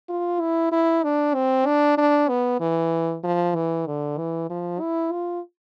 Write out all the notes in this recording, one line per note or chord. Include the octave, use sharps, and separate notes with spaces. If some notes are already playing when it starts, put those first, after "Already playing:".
F4
E4
E4
D4
C4
D4
D4
B3
E3
F3
E3
D3
E3
F3
E4
F4